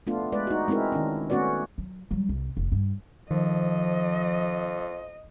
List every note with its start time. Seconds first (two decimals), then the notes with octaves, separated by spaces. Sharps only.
0.07 A3 B3 D4 F4
0.32 G#3 B4 D5
0.47 D#4 F#4
0.68 G#3 C4 D#4 E4 A#4
0.92 D#3 C#4 D4
1.30 A3 B3 C#4 F#4 B4 D5
1.78 F#3
2.11 F#3 G3
2.29 C2
2.57 F1
2.72 G2
3.30 F2 D#3 F3 D#5